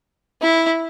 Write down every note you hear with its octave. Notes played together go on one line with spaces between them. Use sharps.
E4